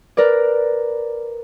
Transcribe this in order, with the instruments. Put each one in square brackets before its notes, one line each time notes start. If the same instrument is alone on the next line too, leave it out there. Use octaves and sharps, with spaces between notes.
[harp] A#4 B4 D5